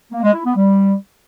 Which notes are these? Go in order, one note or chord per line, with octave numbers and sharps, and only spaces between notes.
A#3
G#3
E4
B3
G3